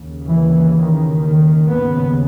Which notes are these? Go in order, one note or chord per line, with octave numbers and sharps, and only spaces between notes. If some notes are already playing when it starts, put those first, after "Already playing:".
Already playing: D#2 C#3
E3
D#3
D#3
D#2 C#3 B3